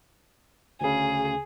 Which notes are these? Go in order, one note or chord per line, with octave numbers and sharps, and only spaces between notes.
D2 C#3 G#4